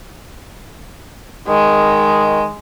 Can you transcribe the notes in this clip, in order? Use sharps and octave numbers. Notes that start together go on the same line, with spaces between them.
D#3 G#3